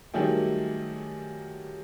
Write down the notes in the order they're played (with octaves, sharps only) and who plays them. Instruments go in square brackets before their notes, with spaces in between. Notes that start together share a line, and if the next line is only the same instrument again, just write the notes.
[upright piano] D#3 F#3 G3 A3 G#4 G5